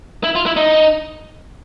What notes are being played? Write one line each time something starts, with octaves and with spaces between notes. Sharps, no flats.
E4
F4
E4
D#4